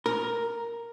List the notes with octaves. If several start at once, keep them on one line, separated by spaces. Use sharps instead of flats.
A#4